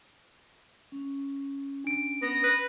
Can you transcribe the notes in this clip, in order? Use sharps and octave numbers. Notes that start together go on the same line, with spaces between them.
C#4
D4 D7
B3 A#6
B4